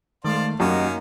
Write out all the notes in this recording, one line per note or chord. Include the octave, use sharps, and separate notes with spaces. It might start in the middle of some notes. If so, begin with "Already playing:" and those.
D#3 G#3 A3 C5 D5 F5
F#2 A#3 C#4 D#4 F#4 G4 D#5